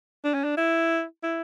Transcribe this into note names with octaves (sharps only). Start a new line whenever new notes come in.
D4
C#4
D4
E4
E4